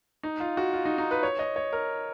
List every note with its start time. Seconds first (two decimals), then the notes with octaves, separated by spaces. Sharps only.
0.23 D#4
0.40 F4
0.57 F#4
0.73 F4
0.85 D#4
0.98 D#4
1.11 B4
1.23 C#5
1.39 D#5
1.56 C#5
1.73 A#4